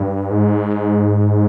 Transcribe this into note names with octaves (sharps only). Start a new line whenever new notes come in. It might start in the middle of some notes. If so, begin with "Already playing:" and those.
Already playing: G2
G#2